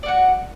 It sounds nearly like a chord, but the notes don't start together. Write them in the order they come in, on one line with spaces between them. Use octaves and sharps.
D5 F#4 F#5